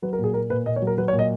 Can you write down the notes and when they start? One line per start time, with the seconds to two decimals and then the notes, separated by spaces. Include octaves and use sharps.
0.02 F#3 B4
0.13 A#4
0.18 A#2
0.24 G#4
0.34 A#3 A#4
0.50 A#2 B4
0.65 A#2 D#5
0.76 C#5
0.82 F#3
0.87 A#4
0.98 F#3 B4
1.08 C#5
1.13 A#2
1.19 D#5